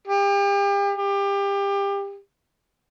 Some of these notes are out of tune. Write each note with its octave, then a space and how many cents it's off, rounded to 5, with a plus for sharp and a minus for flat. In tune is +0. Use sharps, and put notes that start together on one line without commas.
G4 +35
G4 +25